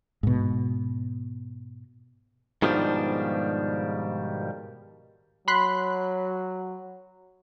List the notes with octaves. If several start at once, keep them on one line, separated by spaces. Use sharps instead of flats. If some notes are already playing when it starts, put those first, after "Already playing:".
G#2 B2
G#2 B2 D#3 F3 G3 D4
F#3 B5 C6 F#6